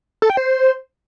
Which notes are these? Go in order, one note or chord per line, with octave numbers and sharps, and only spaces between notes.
A4
G5
C5